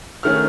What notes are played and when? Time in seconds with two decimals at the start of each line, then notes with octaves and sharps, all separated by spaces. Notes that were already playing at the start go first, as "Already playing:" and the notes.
0.23 D#3 A3 C#4 F6